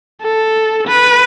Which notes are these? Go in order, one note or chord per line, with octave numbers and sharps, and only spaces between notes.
A4
B4